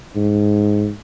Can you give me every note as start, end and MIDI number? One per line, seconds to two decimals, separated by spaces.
0.15 0.90 44